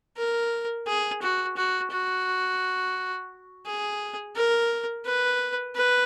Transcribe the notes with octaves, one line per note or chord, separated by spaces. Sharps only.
A#4
G#4
F#4
F#4
F#4
G#4
A#4
B4
B4